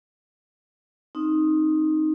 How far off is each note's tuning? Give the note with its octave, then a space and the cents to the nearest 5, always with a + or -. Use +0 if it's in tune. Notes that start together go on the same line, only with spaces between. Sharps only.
C4 +25 D#4 +0